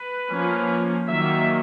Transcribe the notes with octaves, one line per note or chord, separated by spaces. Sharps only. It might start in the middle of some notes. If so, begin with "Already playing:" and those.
Already playing: B4
F3 A#3 C#4
D#3 F#3 A#3 E5